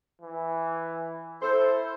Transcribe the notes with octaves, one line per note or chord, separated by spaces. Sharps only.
E3
E4 A4 C5